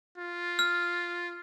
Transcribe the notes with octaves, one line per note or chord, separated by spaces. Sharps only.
F4
F6